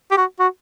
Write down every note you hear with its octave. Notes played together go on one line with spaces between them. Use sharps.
G4
F#4
F#4